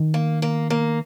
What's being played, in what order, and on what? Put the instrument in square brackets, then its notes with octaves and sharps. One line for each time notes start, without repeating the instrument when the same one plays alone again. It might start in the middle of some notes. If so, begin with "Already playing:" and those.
Already playing: [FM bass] D#3
[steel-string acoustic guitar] A#3
A#3
A#3